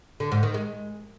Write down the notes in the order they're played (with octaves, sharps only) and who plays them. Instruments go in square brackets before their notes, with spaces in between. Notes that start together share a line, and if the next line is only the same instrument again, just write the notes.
[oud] D3
G#2
D#3
G#3